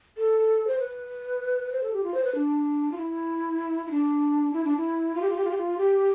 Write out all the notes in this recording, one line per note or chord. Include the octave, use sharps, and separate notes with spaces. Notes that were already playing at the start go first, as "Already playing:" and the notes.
A4
C5
B4
C5
A4
G4
F4
C5
B4
D4
F4
E4
E4
D4
E4
D4
E4
F4
G4
F4
G4
F4
G4
F4
G4